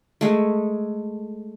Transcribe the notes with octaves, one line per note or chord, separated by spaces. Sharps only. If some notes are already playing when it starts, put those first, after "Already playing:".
G#3 A3